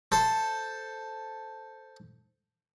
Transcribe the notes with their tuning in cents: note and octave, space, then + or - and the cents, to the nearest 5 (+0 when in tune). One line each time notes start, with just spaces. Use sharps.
A4 +0 C5 +0